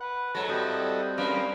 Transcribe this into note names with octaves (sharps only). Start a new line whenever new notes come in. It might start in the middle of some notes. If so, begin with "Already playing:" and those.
B4 F#5
G#2 F#3 A4 C#5 A#5
A2 G3 C4 F#4 G4 A4 D#5
F#2 A#3 C#4 B4 F5